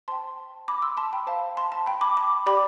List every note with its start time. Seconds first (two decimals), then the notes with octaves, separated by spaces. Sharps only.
0.08 C5 G5 A5 C6
0.68 B5 D6
0.82 C6 E6
0.97 A5 C6
1.13 G5 B5
1.27 C5 F5 A5
1.57 A5 C6
1.72 A5
1.86 G5 B5
2.01 B5 D6
2.17 B5 D6
2.46 G4 D5 G5 B5 D6